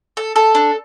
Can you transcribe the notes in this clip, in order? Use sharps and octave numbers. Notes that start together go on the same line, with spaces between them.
A4
A4
D4